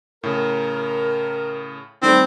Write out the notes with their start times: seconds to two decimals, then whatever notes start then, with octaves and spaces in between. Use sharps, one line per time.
0.23 A2 C#3 A#4
2.02 D#3 G3 A3 C4